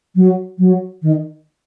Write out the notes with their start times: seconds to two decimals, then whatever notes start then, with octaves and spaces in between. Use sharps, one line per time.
0.15 F#3
0.58 F#3
1.02 D#3